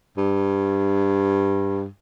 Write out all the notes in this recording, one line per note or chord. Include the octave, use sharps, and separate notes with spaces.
G2